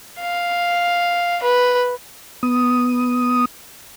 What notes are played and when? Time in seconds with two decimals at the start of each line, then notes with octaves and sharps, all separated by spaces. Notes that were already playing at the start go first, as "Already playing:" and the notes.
0.21 F5
1.43 B4
2.43 B3 D#6